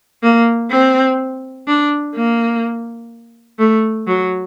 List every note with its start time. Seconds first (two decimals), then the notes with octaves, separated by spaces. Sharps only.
0.23 A#3
0.70 C4
1.68 D4
2.16 A#3
3.59 A3
4.07 F#3